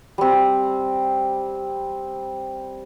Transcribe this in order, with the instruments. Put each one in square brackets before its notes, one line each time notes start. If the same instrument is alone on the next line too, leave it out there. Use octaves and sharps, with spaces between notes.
[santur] G3 C4